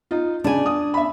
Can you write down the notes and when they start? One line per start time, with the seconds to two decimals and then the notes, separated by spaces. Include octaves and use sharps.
0.11 D#4 F4
0.44 C#3 D4 G#5
0.66 D#6
0.94 E5 B5